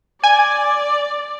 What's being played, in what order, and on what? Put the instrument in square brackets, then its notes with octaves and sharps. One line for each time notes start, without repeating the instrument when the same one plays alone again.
[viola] D5 [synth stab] G#5